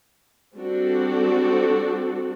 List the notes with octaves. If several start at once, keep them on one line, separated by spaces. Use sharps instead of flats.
G3 C4 D4 F#4 A4